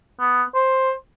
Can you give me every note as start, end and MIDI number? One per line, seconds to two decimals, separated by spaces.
0.20 0.43 59
0.55 0.92 72